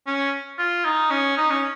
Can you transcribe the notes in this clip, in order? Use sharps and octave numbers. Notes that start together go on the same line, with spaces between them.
C#4
F4
D#4
C#4
D#4
C#4